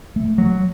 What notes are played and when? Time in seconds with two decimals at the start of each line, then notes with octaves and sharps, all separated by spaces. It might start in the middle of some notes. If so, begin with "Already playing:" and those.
0.16 A3
0.38 F#3